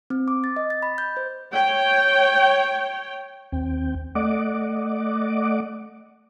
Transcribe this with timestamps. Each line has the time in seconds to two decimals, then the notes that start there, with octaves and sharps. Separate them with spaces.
0.10 C4
0.28 D6
0.44 A6
0.56 D#5
0.70 A6
0.82 B5
0.98 G6
1.17 C5
1.52 C#5 G5
3.52 D#2 C4 G5
4.15 A3 D5 D#5 F#5 D6